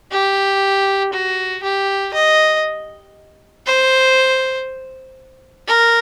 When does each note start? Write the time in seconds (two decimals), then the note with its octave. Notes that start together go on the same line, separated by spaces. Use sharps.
0.12 G4
1.13 F#4
1.63 G4
2.13 D#5
3.66 C5
5.67 A#4